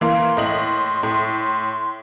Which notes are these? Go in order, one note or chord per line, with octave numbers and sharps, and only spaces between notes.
E3 A#3 C6
A2 D#5 F#7
A2